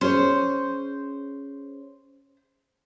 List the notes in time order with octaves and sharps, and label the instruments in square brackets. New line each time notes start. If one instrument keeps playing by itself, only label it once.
[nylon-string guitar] C#4 G#4 C#5 [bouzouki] C5